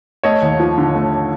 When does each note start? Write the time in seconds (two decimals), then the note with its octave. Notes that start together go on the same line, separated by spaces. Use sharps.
0.23 A3 C#5 D#5
0.42 D#2
0.60 F3
0.78 D3
0.95 A3